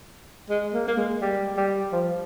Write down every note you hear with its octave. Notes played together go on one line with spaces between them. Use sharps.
G#3
A#3
A#3
G#3
G3
G3
F3